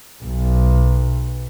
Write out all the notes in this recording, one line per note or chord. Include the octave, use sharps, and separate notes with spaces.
B1